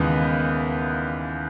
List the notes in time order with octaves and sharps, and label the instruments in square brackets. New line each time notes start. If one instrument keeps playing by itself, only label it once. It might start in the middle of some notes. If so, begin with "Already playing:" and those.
Already playing: [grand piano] D#2 C#3 E3 G#3 B3